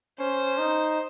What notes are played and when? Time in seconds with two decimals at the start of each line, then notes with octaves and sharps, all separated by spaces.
0.19 C#4 C5
0.58 D#4